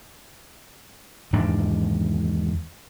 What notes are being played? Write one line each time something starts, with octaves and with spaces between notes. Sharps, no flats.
E2 G#2 D#3 D4